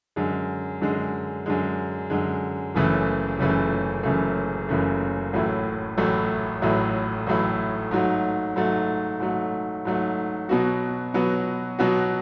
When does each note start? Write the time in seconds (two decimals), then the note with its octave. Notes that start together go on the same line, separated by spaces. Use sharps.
0.16 F#2 D3 G#3
0.81 F#2 D3 G#3
1.46 F#2 D3 G#3
2.10 F#2 D3 G#3
2.75 F#1 F#2 C#3 E3 A3
3.39 F#1 F#2 C#3 E3 A3
4.03 F#1 F#2 C#3 E3 A3
4.69 F#1 F#2 C#3 E3 A3
5.33 A1 A2 F#3 A3 E4
5.97 A1 A2 F#3 A3 E4
6.62 A1 A2 F#3 A3 E4
7.27 A1 A2 F#3 A3 E4
7.91 G#2 F#3 A3
8.56 G#2 F#3 A3
9.20 G#2 F#3 A3
9.85 G#2 F#3 A3
10.49 B2 F#3 B3 F#4
11.14 B2 F#3 B3 F#4
11.79 B2 F#3 B3 F#4